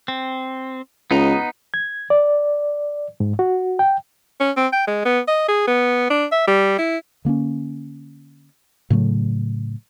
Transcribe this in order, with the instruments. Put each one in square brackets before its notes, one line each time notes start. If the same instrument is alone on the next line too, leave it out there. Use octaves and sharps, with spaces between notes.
[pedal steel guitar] C4
[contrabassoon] C#2 [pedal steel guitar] B3 D#4 A#5
[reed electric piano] G#6
D5
G#2
F#4
G5
[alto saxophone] C#4
C4
G5
G#3
B3
D#5
G#4
B3
D4
E5
G3
E4
[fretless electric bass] D3 A#3 B3 C#4
A2 C#3 F#3 A3